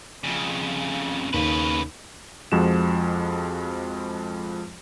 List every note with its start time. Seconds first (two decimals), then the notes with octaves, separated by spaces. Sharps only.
0.24 F2 C#3
1.34 D#2 C#3 B4
2.52 F2 F3 G#3 F#4 E7